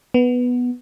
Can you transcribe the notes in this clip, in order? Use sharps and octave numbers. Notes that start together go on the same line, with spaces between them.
B3